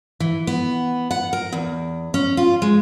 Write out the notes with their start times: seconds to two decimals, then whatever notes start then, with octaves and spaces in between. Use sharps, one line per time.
0.20 E3
0.47 B3
1.11 F#5
1.33 A#4
1.53 E2
2.14 C#4
2.37 F4
2.62 G#3